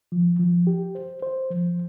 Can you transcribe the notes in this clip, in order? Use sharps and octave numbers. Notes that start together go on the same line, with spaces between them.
F3
F3
G4
C5
C5
F3